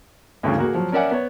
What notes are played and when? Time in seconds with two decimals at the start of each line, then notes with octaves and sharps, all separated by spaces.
0.43 D2 G2 C#3 E3
0.58 A#3 F#4 G#4
0.75 F3 F#3
0.92 C#4 A#4 D5 E5 F#5 G#5
1.11 B3 C#5